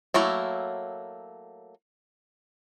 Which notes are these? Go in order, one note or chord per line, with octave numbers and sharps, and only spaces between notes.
F#3 A3 A#3 E4